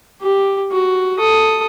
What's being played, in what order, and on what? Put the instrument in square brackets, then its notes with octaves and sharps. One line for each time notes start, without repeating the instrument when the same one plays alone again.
[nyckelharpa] G4
F#4
A4 D#6